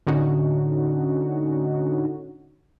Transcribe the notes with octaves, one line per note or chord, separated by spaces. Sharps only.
A2 D3 C#4 D#4 F#4